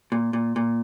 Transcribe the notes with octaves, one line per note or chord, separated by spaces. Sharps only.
A#2
A#2
A#2